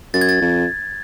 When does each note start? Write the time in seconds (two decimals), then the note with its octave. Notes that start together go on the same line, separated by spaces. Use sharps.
0.14 F#2 A6
0.21 G#6
0.29 A6
0.41 F2